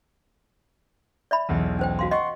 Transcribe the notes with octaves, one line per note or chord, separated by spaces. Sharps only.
D5 E5 B5
B1 E2
C#4 C5 G5
F#4 F5 C6
D#5 F#5 C6 C#6